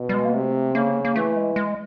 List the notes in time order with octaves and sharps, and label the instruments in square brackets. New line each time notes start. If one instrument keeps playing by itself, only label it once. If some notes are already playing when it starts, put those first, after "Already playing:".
Already playing: [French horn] B2
[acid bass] G3
G#3
A#3
[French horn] C3 [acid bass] A3
[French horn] C#3 [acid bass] A#3
[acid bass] A#3
[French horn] E3 [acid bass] A3
[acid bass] G#3
G#3